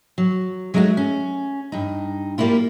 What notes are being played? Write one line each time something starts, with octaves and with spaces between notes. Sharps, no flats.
F#3
F#3 G#3 A3 D#4 E4 F#4
C#4
G2 D#4
G3 A#3 D4 E4 F4